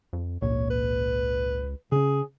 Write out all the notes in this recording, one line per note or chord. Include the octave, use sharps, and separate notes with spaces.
F2
G#1 C#2 A#2 C#5
B4
C#3 C#4 G#4